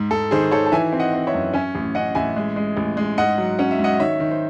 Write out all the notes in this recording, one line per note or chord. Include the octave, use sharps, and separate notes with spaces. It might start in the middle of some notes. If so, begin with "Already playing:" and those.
Already playing: G#2
G#2 A4
D#3 G#4 C5
D#3 A4 C#5
A5
E3 E5 G#5
C4
D#5 F#5
C4
C#5 E5
F#2
C#4 E5 G#5
A1
C#4 D#5 F#5
A1 E5 G#5
G#3
G#3
A1
G#3
G#2 D#5 F#5
F#3
C#4 F#5
E5
G#2
D#5 F#5
D#3 C#5 E5
D#3
C5